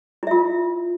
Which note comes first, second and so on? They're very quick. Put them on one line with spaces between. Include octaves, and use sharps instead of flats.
E4 E5 F4